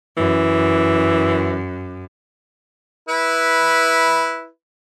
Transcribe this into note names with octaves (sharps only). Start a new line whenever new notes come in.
F#2 E3
E4 B4